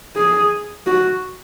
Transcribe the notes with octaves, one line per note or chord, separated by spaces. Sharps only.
G#4
F#4